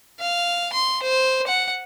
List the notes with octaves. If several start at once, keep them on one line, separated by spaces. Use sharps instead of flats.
F5
C6
C5
F#5